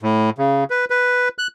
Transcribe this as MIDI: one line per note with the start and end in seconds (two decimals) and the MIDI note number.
0.02 0.30 45
0.38 0.64 49
0.70 0.85 71
0.90 1.29 71
1.39 1.47 90